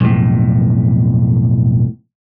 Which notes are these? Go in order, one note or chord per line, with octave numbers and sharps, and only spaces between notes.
B1 F2 A2